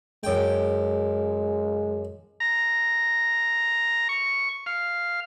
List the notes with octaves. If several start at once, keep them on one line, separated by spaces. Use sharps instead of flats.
F#2 G#3 G5
A#5
C#6
F5